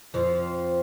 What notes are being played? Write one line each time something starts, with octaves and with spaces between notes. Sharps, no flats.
F2 F3